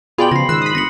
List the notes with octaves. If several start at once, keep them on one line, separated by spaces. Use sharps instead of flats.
B2 F4 G#4 D5 G5 B5 C6 F#7
C#3 F3 A#6 C7
G#2 D#3 E6 F#6
B5 D#6
G1 A#6 C#7 F#7